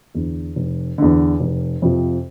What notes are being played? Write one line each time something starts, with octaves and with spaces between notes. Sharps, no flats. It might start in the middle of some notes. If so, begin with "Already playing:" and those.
E2 D3
F1
E2 D3
F1
F2 C3 F3 C4